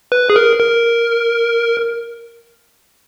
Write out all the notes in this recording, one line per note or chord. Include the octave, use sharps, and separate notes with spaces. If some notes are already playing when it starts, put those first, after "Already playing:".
B4
G#4
A#4
A#4